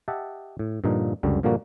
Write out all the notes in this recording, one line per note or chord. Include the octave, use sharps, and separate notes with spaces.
G4 D#5 E5 F#5 A5
A2
G2 A#2 D3 F3 D#4
C#2 F#2 D3 G3
G2 A#2 D3 F3 A#3 F#4